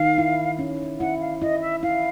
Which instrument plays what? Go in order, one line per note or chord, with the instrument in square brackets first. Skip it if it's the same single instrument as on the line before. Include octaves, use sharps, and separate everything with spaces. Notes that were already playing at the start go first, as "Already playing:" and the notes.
Already playing: [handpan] D#3 [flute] F5
[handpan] E4
C#4
[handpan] E4 [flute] F#5
[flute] F5
[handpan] E4 [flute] D#5
[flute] E5
[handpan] E4 [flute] F5